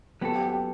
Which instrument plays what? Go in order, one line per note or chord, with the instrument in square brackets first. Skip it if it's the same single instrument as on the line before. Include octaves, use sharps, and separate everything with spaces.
[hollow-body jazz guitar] F#3 B3 F#4 A4 [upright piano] G4
[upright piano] G4
G4